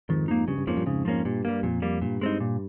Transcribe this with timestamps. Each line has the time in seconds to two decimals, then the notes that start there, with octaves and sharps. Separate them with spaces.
0.09 F2 G#2 D#3
0.28 A#3 D#4
0.48 G2 C#3
0.58 G2
0.67 F2 G#2 F3 A#3 C#4
0.77 G2 A#2
0.86 F2 G#2 C#3
1.05 F3 A#3 C#4
1.25 G2 A#2
1.45 G3 A#3
1.63 F2 A#2
1.82 G3 A#3
2.02 G2 A#2
2.21 G#3 C4 D#4
2.40 A#2